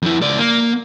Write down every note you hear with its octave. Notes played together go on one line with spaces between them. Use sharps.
F2 E4
C#2 D5
A#3